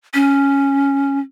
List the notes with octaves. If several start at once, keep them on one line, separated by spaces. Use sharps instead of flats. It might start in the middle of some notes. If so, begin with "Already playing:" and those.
C#4